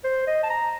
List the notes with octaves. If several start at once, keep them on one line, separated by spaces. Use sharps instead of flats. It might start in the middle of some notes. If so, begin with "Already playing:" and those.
C5
D#5
A5
A#5